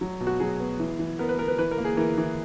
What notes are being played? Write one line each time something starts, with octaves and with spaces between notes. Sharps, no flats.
F#3
B2
F#4
F#3 G#4
B3
E3
E3
B3 A#4
B4
B3 A#4
B4
E3 B4
A#4
A#3
G#4
E3 A#4
E3